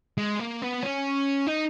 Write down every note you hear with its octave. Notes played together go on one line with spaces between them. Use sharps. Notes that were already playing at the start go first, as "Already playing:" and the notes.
G#3
A#3
B3
C#4
D#4